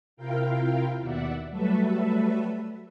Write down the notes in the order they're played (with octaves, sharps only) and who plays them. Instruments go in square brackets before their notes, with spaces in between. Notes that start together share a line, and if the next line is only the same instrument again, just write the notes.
[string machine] C3 E4 F4 A#4 F5 G5
D#2 B2 D5 E5 F#5
F#3 G3 A3 A4 B4 E5